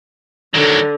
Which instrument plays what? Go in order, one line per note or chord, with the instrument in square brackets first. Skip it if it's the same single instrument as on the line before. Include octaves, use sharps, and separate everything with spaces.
[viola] D3 [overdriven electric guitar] D#3 F#3